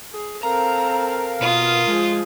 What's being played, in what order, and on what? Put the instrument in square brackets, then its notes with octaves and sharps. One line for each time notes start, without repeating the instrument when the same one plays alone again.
[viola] G#4
[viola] C4 A4 [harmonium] A#4 F5 [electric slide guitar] A#5
[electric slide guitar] B2 [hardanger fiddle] F4 D#6
[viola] F3 G#4 [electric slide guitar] G#3